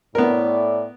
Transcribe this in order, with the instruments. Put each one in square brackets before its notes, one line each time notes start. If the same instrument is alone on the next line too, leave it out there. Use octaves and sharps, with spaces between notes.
[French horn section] A2 D5 [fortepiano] B3 A#4